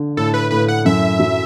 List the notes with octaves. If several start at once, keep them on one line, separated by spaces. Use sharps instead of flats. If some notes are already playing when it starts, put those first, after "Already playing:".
Already playing: D3
A2 A4
B4
A2 B4
F#5
F#2 E5
F#3